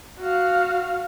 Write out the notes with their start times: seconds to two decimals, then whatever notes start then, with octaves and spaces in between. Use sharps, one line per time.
0.19 F#4 F5